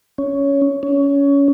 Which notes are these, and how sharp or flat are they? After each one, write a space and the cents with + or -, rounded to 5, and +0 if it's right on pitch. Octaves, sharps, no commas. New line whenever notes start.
C#4 +10
C#4 +20